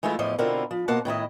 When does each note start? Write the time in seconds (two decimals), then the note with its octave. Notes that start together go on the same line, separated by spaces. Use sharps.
0.03 E3 G#3 A3 E4 F4
0.19 E2 A2 F3 D#5
0.38 B2 D3 C4 E4 F4 A#4
0.71 F3
0.88 B2 A#3 C5 F#5 A5
1.05 A2 D#3 E4 D#5